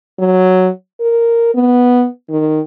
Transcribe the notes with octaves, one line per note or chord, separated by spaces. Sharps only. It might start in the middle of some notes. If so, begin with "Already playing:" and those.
F#3
A#4
B3
D#3